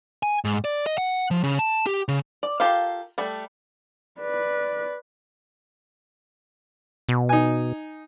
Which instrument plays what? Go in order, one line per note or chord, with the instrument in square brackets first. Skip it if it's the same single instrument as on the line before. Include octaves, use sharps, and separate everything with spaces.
[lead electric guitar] G#5
G#2
D5
D#5
F#5
F3
C#3
A5
G4
C#3
[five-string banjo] D5
F4 G4 A4 A#4 F5
G3 A3 A4
[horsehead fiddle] B4 D5
[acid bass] B2
[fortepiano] D#4 G#5